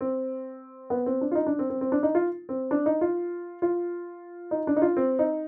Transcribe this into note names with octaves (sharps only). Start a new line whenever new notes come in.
C4
B3
C4
D4
F4
D#4
D4
C4
C4
C4
D4
D#4
F4
C4
D4
D#4
F4
F4
D#4
D4
D#4
F4
C4
D#4